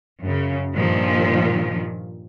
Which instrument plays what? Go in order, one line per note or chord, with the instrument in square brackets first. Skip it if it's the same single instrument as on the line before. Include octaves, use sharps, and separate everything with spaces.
[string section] F#2 C#3
G2 A#2 D#3 F3